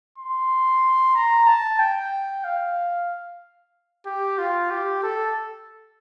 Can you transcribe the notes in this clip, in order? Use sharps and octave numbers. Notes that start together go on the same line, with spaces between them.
C6
A#5
A5
G5
F5
G4
F4
G4
A4